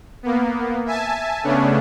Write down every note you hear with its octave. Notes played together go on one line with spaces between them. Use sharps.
A#3 B3
E5 G#5 A5
C#3 A3 B3 C#4 D4